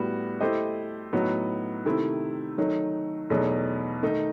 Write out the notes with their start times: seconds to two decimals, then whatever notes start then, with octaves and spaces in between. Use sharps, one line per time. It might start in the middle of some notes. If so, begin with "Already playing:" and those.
Already playing: A2 G3 B3 F#4
0.41 A3 E4 G4 C5 D#5
1.13 A2 F#3 B3 D#4 F#4
1.85 C3 D#3 A3 C4 E4
2.58 D#3 F#3 A3 D#4
3.30 E2 B2 F#3 A3 D#4
4.03 D#3 A3 D#4